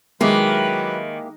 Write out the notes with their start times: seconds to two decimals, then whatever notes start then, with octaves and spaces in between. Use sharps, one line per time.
0.21 D#3 F#3 G#3 A#3 E4 G4 B4